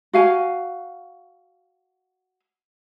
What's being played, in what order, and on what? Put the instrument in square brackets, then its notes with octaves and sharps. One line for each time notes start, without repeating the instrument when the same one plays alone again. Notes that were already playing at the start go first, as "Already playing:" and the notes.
[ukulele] F#4 F5 G#5